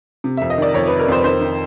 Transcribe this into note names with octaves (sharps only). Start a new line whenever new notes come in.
C3
F2 E5
D#5
D#3 D5
F2 C#5
C3 B4
A#4
F2 C5
B4
D#3 C5
D#3